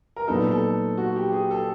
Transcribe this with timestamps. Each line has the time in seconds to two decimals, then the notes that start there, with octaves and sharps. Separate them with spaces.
0.16 A#4
0.28 A#2 F#3 B3 D#4 A4
0.51 A4
0.97 F#4
1.16 G4
1.32 G#4
1.51 A4